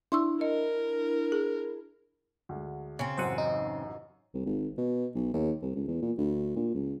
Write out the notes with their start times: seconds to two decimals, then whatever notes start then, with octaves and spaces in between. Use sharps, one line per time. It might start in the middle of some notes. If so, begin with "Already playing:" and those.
0.12 D4 E4 C6 C#6 E6
0.41 A#4 D#5
1.32 G#4
2.49 D2 D3 G#3
2.99 C#3 C4
3.17 A1 F#2 C5 F#5 D#7
3.38 D#4
4.34 C2
4.46 G#1
4.78 B2
5.15 B1
5.34 D#2
5.62 C2
5.76 C#2
5.88 E2
6.02 A#2
6.18 D2
6.56 A#2
6.74 C#2